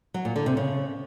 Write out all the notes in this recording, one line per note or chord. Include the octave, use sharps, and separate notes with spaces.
F#3
A#2
D3
C3
C#3